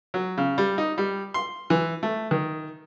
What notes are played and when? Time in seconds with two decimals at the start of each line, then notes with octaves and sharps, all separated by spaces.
0.14 F#3
0.38 C#3
0.58 G3
0.78 D#4
0.98 G3
1.34 C6
1.70 E3
2.03 A3
2.31 D#3